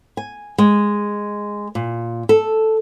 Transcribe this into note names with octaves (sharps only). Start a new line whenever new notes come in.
G#5
G#3
A#2
A4